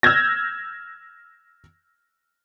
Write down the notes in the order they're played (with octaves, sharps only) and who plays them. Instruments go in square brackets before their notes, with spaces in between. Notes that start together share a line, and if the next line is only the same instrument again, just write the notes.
[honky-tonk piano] E6 F6 G6 G#6 A#6